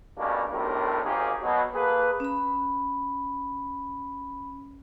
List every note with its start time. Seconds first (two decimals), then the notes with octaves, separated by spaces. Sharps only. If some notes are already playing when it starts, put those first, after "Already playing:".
0.18 G2 B2 A3 A#3 C#4 D4
0.51 B1 A2 C3 G3 D4 A#4
1.03 G#1 G#2 A#3 C#4 G4 G#4
1.42 B2 F#3
1.74 A#3 G#4 A4 B4
2.20 C#4 B5